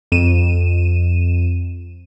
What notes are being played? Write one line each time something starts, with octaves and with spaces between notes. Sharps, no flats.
F2 D#7 E7